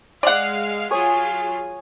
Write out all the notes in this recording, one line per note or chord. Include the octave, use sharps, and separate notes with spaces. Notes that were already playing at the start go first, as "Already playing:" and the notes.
G#3 D5 F5 F#5
F#3 F4 G#4 C#5 G#5 D#6